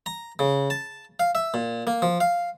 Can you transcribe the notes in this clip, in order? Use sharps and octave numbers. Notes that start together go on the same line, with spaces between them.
A#5
C#3
A5
F5
E5
A#2
A#3
F3
F5